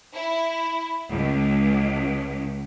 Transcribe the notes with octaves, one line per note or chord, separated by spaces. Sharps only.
E4
C#2